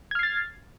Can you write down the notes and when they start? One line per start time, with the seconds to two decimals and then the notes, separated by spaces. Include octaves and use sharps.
0.11 G#6
0.15 F6
0.19 C7
0.23 A6